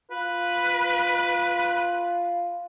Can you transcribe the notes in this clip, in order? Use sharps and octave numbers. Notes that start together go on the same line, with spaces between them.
F4 B4